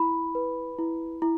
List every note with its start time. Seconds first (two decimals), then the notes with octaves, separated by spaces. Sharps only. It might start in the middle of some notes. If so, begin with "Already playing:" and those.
Already playing: E4 B5
0.35 B4
0.78 E4
1.22 E4